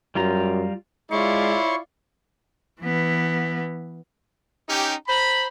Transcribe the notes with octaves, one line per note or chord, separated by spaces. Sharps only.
F#2 G3 F4 A#5
G#3 E4 F4 C#5 D5 C6 C#6
E3 B3
C#4 D#4 G4
C5 A#5 B5